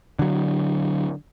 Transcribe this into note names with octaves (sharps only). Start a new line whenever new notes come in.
D3 F#3